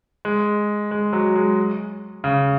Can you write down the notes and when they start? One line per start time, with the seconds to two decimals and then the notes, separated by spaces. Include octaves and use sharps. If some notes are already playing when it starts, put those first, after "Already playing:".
0.25 G#3
0.91 G#3
1.13 F#3
1.35 G#3
2.24 C#3